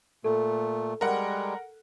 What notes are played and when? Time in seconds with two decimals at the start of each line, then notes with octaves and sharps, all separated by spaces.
0.24 A#2 A3 A4
1.01 G3 G#3 A#4 F#5